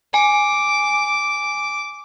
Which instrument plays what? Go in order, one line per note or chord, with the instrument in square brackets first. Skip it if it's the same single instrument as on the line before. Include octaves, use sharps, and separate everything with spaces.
[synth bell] G#5 [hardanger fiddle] D6